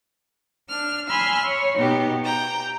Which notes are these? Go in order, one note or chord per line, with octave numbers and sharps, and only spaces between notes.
D4 F6
G#5 B5 C6 E6 F6
C#5
B2 B3 D#4 G4
G5 A#5